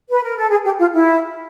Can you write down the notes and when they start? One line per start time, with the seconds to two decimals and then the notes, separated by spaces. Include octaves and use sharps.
0.10 B4
0.23 A#4
0.37 A4
0.50 G#4
0.65 G4
0.79 F4
0.94 E4